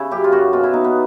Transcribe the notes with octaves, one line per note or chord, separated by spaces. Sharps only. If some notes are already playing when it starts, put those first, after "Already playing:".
Already playing: C#3 E4
F#2 G4
F4
F#2 F#4
B2 F4
E4
B2 D#4
B3